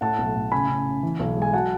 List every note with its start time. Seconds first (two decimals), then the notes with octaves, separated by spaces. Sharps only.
0.01 A2 F#5 A5
0.18 B1
0.36 A2
0.52 C#3 G#5 B5
0.69 C#3
0.86 C#3
1.03 E3
1.20 B1
1.37 G#3 G#5
1.53 F#3 F#5 A5